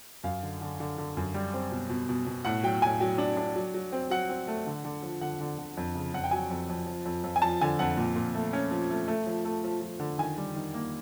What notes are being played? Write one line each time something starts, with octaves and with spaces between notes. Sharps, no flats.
F#2 F5
D3
D3
D3
D3
F#2
G3
C4
B2
B2
B2
B2
A2 F#5
F#3 G5
A2 G#5
F#3 G5
D4
D4
F#3
F#3
C4
F#3 F#5
C4
A3
D3
D3
F3
D3 F#5
D3
D3
F2
C#3
F2 F#5
G5
F#3 G#5
F2
F2
F3
F2
F2
G#5
F3 A5
D3 G#5
F2 F#5
A#2
A#2
A3
C#4
F3
A3
A3
F3
A3
F3
F3
D3
D#3 G#5
G3
D#3
A#3